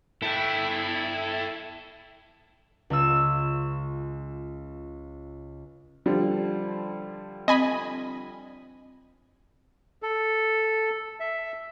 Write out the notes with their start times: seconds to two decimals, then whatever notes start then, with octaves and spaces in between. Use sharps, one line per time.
0.22 E4 A4 G5
2.90 C#2 C#4 F4 E6
6.06 D3 F3 G3
7.48 C4 D#5 G#5 B5
10.02 A4
11.20 E5